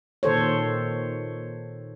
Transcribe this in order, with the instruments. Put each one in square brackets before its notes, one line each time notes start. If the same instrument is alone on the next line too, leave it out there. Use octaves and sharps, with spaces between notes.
[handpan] A#2 D#3 A4 C5 C#5